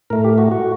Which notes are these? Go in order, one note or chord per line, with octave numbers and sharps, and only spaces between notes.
A2 A3 A#4
G4
F#4
F#4